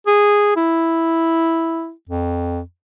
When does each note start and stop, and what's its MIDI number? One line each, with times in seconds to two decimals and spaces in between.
0.07 0.55 68
0.56 1.91 64
2.09 2.60 41